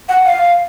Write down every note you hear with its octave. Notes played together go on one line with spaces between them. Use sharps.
F#5
F5